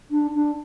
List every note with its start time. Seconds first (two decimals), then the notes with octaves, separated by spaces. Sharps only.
0.11 D4
0.35 D4